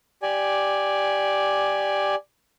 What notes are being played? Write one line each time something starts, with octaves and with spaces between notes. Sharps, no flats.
G4 D5 G#5